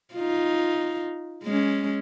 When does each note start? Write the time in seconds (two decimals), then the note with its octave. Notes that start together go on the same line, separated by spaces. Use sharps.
0.14 D#4 F4
1.44 G#3 C#4